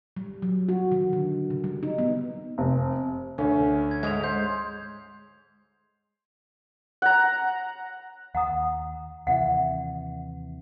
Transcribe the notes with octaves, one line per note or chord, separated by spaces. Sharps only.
G3
F#3
F#4
D#3
D3
C#3
G3
D#4
B3
F1
D2 C#4
G#6
G#2 G#3 G#6 F7
C5 G6
F#5 A#5
D#2 F#5 A#5 D#6
D#2 C3 E3 E5 F#5